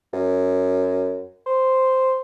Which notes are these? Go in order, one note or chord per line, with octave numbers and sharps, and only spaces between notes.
F#2
C5